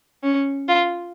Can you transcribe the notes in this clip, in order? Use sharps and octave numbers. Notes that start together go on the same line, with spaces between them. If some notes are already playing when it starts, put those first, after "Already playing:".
C#4
F4